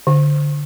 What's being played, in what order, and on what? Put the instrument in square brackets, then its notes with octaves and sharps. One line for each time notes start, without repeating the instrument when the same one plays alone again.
[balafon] D3